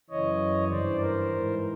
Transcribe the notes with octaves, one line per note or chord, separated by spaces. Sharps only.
F#2 C#3 E3 C#5 D#5
G2 E3 C5 D5
A#4 C5
G#2 E3